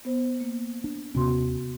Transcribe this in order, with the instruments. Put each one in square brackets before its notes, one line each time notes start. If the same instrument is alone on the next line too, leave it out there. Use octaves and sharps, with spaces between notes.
[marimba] B3 C5
A#3
[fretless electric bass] D4
[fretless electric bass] D#2 C3 C#4 [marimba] B3 F#4 C6